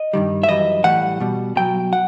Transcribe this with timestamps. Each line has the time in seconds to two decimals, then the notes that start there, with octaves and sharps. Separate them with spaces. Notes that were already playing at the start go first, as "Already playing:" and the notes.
Already playing: D#5
0.13 G2 D#3 G3
0.43 E5
0.48 F#2 E3 G3 D#5
0.84 A2 E3 G3 F#5
1.20 B2 G3
1.56 B2 F#3 G5
1.93 F#5